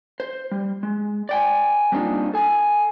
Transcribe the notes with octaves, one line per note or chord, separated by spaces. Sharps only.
C5
G3
G#3
D5 G5 G#5
G3 A#3 C4 D4 D#4 F4
A4 G#5